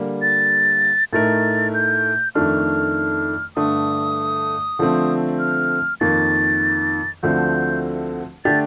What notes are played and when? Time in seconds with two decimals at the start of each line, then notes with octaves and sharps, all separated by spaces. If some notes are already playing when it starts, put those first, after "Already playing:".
Already playing: D3 G3 A#3
0.22 A6
1.13 A2 A3 D#4 A#4 A6
1.74 G6
2.35 F2 D#3 A3 D4 F6
3.56 G2 D3 A3 D4 D#6
4.79 D3 F3 A3 C4
5.39 F6
6.00 F2 D#3 A#3 A6
7.23 D2 D3 F3 A3 C4 G6
8.45 D3 A3 D4 G4 A6